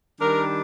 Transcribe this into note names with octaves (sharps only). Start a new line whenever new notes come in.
D#3 G3 D4 A#4